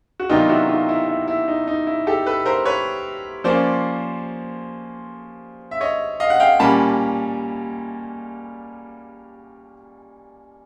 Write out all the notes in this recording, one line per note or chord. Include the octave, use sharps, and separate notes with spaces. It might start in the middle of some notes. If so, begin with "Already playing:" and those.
F#4
C3 D#3 F#3 B3 D4 D#4 F4
E4 F#4
D#4 F4
E4
E4
E4
D#4
D#4
E4
G4 A4
A4 B4
A#4 C5
B4 C#5
F3 A#3 C#4 C5 D5
E5
C#5 D#5
D#5 F5
F#5
F5 G5
A#2 G3 A#3 C#4 A5 B5